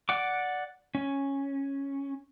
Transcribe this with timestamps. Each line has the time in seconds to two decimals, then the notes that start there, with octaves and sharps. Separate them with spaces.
0.09 D5 F#5 D6
0.95 C#4